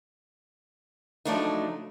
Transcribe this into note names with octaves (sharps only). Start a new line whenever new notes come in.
C#3 F3 F#3 A3 D4 D#4